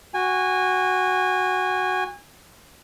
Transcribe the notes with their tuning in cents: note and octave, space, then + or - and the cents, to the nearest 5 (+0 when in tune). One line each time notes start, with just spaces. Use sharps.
F#4 +0 G#5 -25